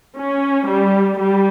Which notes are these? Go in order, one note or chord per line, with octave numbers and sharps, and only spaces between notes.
C#4
G3
G3